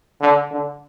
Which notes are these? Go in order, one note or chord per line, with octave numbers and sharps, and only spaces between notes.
D3
D3